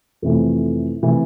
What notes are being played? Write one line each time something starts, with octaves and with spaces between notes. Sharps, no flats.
F2 C3 E3 A3
C3 E3 A3